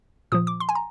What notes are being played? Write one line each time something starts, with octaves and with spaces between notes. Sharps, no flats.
A#2 F3 D#6
D6
C6
G#5
A#5